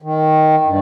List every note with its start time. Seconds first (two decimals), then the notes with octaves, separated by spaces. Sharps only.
0.02 D#3
0.66 G2